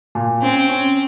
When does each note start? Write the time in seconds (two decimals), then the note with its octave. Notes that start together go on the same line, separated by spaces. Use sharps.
0.15 A#2
0.42 C4 C#4
0.69 C#4